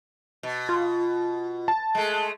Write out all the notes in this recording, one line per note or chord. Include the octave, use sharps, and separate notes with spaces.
B2
F4
A5
G#3 A3